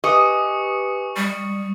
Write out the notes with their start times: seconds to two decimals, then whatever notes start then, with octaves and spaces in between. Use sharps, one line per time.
0.04 G4 B4 D#5 G#5 C#6 D#6 C#7
1.16 G3 C#6